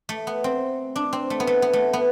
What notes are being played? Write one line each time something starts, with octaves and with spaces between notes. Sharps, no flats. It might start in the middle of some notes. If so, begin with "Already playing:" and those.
A3
B3
C4
D4
C4
A3
B3
A3
B3
A3
B3